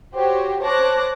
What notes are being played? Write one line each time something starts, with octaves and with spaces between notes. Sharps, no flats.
F#4 G4 C5 C#5
C5 C#5 A5 D6 F#6 A#6